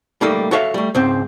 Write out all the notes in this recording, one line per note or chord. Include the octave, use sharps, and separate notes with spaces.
G3 A3 A#3 D#4 A4
F#4 A4 C#5 E5 F5
G3 A3
C#2 G#2 C4 C5